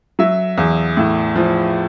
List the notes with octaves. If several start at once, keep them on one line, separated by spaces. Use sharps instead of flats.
F#3 E5
E2
A2
F3